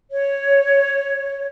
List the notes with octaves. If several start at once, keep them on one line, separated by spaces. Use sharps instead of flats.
C#5